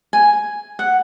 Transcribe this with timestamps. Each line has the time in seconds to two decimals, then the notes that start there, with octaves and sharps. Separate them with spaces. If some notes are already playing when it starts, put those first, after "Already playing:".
0.13 G#5
0.79 F#5